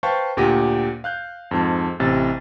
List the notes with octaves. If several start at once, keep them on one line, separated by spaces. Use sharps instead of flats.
B4 C5 F5 G5 A5 C#6
D2 A#2 G4 F#5 A#6 D#7
F5 F#6 G6
F2 G#2 A5
A1 C3 E4 A6